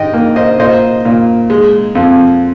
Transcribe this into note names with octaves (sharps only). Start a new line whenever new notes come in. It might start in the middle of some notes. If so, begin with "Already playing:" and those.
Already playing: G#2 D#5 G5
A#3
C5 D#5
A#2 C5 D#5
A#2
G#3
F2